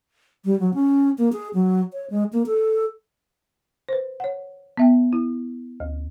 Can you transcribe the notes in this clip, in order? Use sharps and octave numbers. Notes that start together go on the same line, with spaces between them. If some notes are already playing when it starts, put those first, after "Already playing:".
G3
F#3
C#4
A#3
G#4
F#3
C#5
G#3
A#3
A4
B4 C5
C#5 F#5
B3 E5 G5
E4
D2